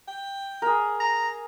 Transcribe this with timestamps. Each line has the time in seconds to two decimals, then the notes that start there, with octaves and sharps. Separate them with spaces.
0.08 G5
0.62 G#4 A#4
1.00 A#5